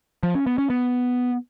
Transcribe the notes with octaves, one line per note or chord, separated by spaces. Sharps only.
F3
C#4
B3
C#4
B3